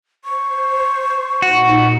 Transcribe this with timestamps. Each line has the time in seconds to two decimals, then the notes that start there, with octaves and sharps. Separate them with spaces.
0.25 C5 C#6
1.42 A#2 D#4 F#4